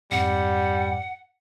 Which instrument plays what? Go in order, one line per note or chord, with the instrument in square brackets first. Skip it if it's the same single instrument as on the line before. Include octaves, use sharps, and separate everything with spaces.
[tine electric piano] F2 G#2 [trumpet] G3 [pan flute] F#5